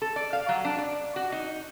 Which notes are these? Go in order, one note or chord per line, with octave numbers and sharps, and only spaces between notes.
A4
D5
F5
F#3
D4
D5
F#4
D#4